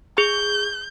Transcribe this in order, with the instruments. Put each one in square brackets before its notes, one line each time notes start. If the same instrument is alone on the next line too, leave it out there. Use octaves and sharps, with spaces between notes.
[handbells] G#4 [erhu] G6